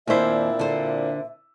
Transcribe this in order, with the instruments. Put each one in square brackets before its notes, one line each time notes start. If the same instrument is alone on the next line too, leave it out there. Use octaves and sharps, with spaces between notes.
[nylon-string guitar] D#2 C5 [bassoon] A#2 [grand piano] C4 D4 E4 [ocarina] E5
[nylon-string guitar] D3 C5